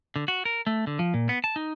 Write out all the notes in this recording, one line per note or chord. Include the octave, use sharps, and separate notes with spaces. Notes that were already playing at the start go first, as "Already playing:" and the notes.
D3
F#4
A#4
A3
D3
F3
A#2
B3
A5
D#4